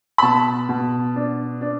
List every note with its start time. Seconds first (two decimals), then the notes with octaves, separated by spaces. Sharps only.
0.18 B5
0.22 B2 A5
0.69 B2
1.16 D4
1.61 D4